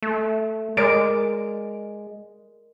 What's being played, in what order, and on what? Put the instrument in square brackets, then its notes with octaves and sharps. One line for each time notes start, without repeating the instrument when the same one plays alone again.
[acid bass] A3
[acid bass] G#3 [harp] A#4 D5 D7